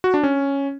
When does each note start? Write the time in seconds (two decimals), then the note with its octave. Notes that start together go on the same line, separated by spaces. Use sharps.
0.04 F#4
0.14 D4
0.23 C#4